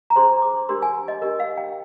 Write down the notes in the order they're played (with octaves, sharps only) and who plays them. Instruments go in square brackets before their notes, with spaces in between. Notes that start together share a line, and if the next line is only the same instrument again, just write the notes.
[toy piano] A#5
D4 G#4 C5 C6
D6
D4 G4 A#4 C6
G#5
D#5
D4 G4 A#4 D#5
F5
G5